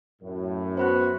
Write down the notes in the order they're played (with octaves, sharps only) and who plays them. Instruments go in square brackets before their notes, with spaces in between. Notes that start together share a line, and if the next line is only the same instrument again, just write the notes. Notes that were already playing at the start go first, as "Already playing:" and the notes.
[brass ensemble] F#2 A2
[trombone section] B3 F#4 [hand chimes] C5 B5 F#6